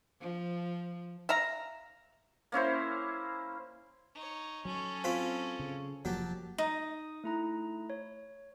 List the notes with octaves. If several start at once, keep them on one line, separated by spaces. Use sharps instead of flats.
F3
E5 F5 A#5
A#3 C#4 E4 C5
D#4 C#5
F#3 C#4 A4
C4 F4 B5
C#3
F1 F3 F#3 A#3 G4 A5
D#4 D#6
A3 E4 A#5
C#5